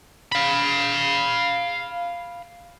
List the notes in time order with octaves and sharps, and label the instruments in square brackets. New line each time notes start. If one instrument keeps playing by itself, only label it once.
[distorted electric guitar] F5 B5